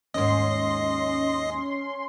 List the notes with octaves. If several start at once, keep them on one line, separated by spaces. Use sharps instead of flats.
D#2 G#2 C#4 D#5 C6